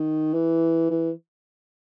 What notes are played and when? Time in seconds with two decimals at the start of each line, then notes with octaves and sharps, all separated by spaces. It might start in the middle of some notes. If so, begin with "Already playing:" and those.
Already playing: D#3
0.33 E3
0.90 E3